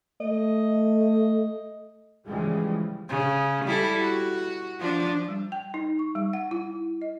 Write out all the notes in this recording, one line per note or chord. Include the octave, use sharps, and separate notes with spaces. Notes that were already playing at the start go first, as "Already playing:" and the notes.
A3 D#5
C#3 E3 F3 G3 G#3
C#3
G3 E4 A4
F#4
F3 D4
G3
G5
D#4
C#6
G3
F#5
E4
D#5